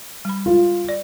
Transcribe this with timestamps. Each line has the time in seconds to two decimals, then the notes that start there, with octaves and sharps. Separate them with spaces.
0.25 G3 B5
0.46 F4
0.89 D5